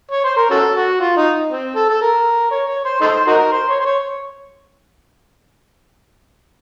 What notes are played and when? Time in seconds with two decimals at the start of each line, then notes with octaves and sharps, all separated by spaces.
0.11 C#5
0.24 C5
0.37 A#4
0.51 C#4 F#4 A4
0.75 F#4
1.01 F4
1.17 D#4
1.51 C4
1.76 A4
1.90 A4
2.01 A#4
2.51 C#5
2.68 C#5
2.85 C5
3.01 D#4 A4 C5
3.27 D#4 F#4 A#4
3.52 C5
3.69 C#5
3.80 C5
3.85 C#5